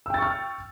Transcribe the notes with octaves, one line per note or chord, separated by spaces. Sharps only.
G5 C#6 E6 F6 A6